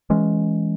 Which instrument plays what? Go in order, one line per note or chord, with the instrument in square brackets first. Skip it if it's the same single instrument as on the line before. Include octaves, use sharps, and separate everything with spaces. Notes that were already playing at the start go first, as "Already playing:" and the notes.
[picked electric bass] E3 G#3 C#4